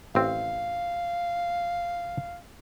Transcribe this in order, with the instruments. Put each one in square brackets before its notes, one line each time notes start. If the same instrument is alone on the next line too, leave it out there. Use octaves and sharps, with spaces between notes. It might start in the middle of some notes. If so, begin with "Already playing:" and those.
[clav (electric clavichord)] A1 C4 [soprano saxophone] F5